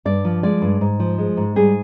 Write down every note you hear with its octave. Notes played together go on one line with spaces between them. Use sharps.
G2 D5
F3
G#3 D5
G2
G#2
F3
G#3
G#2
G3 G#4